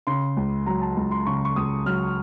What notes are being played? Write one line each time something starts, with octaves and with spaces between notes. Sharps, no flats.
C#3 C6
C#2
F#3 A#5
A5
C#2
C6
C#3 C#6
C#6
C#2 D#6
F#3 F6